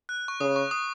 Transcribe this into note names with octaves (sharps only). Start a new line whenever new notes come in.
F#6
C#6
C#3 D#6
C#6
D#6